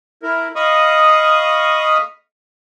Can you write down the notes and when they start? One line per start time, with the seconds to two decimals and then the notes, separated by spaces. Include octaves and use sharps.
0.23 E4 A#4
0.56 D#5 F5 B5 C#6 D#6